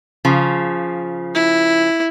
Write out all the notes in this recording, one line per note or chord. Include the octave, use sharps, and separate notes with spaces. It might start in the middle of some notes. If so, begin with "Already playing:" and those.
C#3 F3
E4